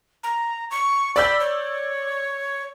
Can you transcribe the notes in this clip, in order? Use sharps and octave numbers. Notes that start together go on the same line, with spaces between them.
A#5
C#6
D5 B5 E6 G6
C#5